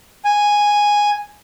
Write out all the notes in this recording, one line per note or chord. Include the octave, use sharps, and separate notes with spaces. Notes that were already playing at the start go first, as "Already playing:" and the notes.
G#5